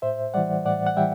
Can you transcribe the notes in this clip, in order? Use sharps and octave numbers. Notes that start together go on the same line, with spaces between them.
A2 C5 E5
E3 G3 D5 F#5
A2 D5 F#5
F#5
E3 G3 E5 G5